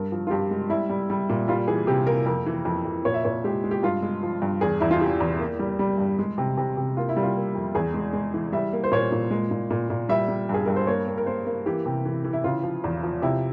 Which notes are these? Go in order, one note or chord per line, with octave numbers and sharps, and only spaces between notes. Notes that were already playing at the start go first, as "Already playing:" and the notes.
Already playing: G2 A#4
F3
F4
G2 G4
G#3
G3 E4
G3
G3
A#2
G3 F4
E3 G#4
C3 G4
A#3 A#4
F2 A#4
E3
F2
F2
A#2 C#5
E5
A#2 C#5
G#3 G4
G#3
G4
G2 F4
G#3
F3
G2
E2 G#4
E2 E4
F4
E3 G4
E2
A#3
G3
G3
G2
G#3
C3
C3
C3
A#3 F4
E4
G3
F4
A#3
F2
E2 G#4
G#3
G#3
E3
G3 E5
A#3
C5
A#2 C#5
A#2
G#3
A#2
A#2
A#2
G3 E5
G3
G2 G#4
G2 A#4
C5
A#3 C#5
A#3
A#4
A#3 C5
A#3
E3 G4
C3
E3
E3
E4
C#3 F4
F3
E2
F3
C3 E4